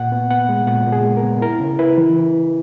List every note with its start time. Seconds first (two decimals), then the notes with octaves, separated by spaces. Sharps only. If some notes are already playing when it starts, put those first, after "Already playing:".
Already playing: A#2 F#5
0.12 B3
0.30 B3 F#5
0.49 G#3
0.67 A#2 F#5
0.86 A#2
0.92 G#4
1.05 G#3
1.17 A#4
1.23 B3
1.41 E4 A#4
1.60 C#3
1.79 E4 B4
1.98 E3